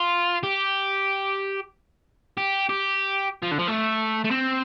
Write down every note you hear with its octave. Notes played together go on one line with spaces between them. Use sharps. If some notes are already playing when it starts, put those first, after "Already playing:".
Already playing: F4
G4
G4
G4
F3
D3
F3
A3
A3
C4